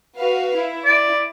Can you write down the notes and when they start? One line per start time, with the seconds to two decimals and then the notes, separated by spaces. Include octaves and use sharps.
0.18 F#4 B4 F5
0.57 E4
0.85 D5